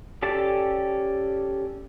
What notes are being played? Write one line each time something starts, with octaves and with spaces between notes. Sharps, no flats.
C#4 G4 A4 D5 A5